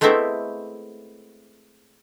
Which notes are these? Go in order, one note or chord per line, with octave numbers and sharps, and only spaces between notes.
G#3 A3 B3 C4 E4 E5